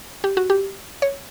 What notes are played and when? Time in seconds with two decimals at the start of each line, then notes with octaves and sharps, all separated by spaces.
0.24 G4
0.37 F#4
0.50 G4
1.02 C#5